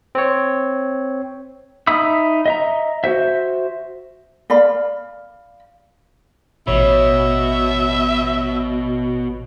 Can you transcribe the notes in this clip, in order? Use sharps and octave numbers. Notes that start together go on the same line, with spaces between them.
C4 C#5
D#4 E5 B5 D#6 E6
D#5 E5 A#5
F#4 C5 E5
D5 F5 B5
A1 B2 C#5 E5 B5